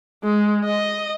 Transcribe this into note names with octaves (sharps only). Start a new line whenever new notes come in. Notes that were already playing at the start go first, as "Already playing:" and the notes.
G#3
D#5